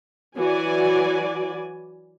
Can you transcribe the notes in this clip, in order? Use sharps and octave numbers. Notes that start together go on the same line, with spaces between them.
E3 F#3 F#4 D5 G#5